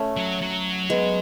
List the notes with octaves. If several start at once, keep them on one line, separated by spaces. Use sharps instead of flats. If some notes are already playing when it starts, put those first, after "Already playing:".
Already playing: A3 C#4
F#3
F#3
G#3 B3